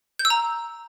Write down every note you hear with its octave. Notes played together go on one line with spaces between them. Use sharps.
G6
E6
A#5